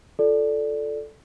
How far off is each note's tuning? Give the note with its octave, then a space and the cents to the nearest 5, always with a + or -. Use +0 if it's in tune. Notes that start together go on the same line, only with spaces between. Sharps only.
F4 +0 A4 +0 D5 +0